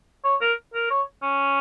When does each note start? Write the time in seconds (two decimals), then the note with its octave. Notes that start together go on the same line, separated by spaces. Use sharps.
0.24 C#5
0.41 A#4
0.74 A#4
0.90 C#5
1.23 C#4